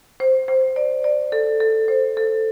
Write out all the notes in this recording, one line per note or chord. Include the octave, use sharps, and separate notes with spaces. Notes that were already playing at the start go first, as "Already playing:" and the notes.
C5
C5
D5
D5
A4
A4
C5
A4